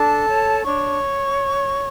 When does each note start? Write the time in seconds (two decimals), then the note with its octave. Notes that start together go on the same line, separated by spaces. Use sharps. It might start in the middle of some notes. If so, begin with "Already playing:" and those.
Already playing: D4 A4 A5
0.29 C#5
0.64 D4 C#5 C#6